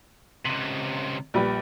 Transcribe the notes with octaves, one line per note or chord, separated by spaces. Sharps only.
C#2 C3 F#7
A#1 G3 B4